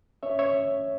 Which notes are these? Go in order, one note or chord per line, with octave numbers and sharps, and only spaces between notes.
C#4 C#5 E5
C#5 E5